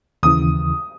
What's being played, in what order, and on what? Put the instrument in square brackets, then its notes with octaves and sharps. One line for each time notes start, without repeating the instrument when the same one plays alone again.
[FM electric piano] D#2 C#3 E3 [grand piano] D#6